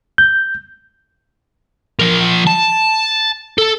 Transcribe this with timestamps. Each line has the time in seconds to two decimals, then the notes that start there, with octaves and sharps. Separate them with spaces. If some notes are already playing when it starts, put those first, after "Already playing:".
0.18 G6
1.99 F3 A#4
2.47 A5
3.58 A4